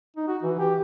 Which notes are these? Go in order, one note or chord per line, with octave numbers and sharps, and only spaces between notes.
D#4
F#4
E3
G4